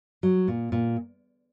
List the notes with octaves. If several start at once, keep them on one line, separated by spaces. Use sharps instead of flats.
F#3
A#2
A#2